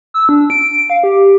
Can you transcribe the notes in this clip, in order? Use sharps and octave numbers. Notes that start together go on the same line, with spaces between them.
E6
D4
D7
F5
G4